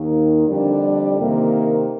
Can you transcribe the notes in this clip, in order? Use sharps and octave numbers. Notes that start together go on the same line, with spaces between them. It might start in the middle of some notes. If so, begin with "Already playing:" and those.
Already playing: D#2 D#3 A#3
F2 D3 G3 D4 G4
C3 D#3 A#3